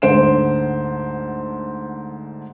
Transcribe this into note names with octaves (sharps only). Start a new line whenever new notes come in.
D2 G#2 D3 C5 D7 E7